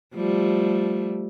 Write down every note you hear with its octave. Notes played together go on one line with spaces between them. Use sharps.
F3 G3 A3